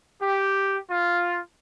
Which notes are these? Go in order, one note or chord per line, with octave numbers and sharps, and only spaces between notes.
G4
F4